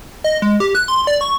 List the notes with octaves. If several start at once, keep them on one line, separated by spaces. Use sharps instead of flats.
D#5
G#3
G4
F#6
C6
D5
C#6